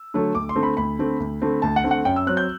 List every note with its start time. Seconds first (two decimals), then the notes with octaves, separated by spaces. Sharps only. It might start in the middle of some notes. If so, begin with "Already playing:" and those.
Already playing: E6
0.14 D3 F#3 A3
0.35 D2 D6
0.49 C6
0.56 D3 A3 C4
0.63 B5
0.77 D2 B5
0.99 D3 A3 C4
1.20 D2
1.42 D3 A3 C4
1.62 D2 A5
1.76 F#5
1.84 D3 A3 C4
1.91 F#5
2.05 F#2 G5
2.16 E6
2.27 F#3 C4 F#6
2.37 G6